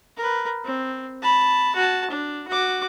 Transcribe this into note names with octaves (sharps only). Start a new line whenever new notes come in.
A#4 B4
C4
A5 B5
F#4 A5
D4
F#4 D6